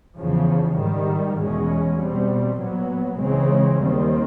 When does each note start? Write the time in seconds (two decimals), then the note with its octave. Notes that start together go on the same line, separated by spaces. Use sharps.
0.18 E2 C#3 F3
0.77 G#2 D#3 G3
1.37 E2 B2 G#3 C#4
1.98 B2 G3 C4
2.58 A#2 F#3 B3
3.19 C#2 C#3 E3 G#3 C4
3.78 D#2 D#3 G3 C4